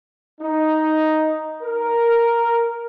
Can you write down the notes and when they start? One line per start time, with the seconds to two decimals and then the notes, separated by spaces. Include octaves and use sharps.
0.41 D#4
1.62 A#4